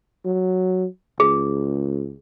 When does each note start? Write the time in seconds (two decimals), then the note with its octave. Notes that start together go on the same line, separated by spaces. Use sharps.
0.25 F#3
1.20 C#2 G#4